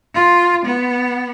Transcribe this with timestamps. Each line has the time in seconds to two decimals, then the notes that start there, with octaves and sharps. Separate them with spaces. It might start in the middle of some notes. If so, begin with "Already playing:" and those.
0.15 F4
0.65 B3